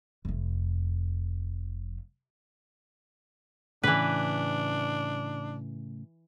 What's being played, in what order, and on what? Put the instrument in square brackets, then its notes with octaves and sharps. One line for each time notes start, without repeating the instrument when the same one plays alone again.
[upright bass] F1 F2
[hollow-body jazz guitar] A2 C#3 [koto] E3 B4 [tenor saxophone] D4